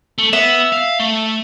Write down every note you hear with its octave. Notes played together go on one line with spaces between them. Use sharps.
A3
B3 E5
F5
A3